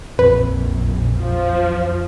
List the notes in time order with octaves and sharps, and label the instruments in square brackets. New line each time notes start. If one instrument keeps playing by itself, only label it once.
[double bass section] A#1 [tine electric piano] F2 [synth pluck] B4
[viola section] F3